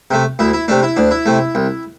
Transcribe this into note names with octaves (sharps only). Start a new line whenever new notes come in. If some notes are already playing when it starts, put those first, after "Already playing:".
C3 A3
D2 E4
E4
C3 A3 D4
E4
D2 D4
E4
C3 A3
C2